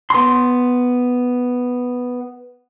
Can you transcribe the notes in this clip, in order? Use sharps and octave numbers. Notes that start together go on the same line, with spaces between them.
B3 C6